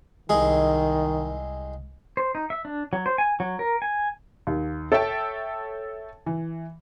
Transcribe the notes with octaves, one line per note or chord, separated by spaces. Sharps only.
C2 D#3 G#3 G#4
C5
D#4
E5
D4
F#3
C5
G#5
F#3
A#4
G#5
D#2
A4 C#5 E5 G5 A5
E3